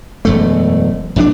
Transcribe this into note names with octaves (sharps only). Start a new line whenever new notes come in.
E1 F#2 A3
A#1 F2 F3 D4